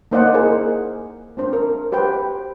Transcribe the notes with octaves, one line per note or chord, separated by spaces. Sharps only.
A#3 D#4 C5 D5 D#5 F#5
D#4 E4 G#4 A#4 C5
C4 D4 C5
A#4
G4 B4 C5 G5